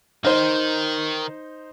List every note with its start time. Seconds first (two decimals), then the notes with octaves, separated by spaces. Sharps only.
0.25 D#3 D#4 C5